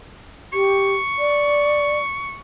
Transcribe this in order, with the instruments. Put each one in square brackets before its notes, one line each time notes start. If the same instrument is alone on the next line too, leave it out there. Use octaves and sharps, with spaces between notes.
[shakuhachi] G4 [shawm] C#6
[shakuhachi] D5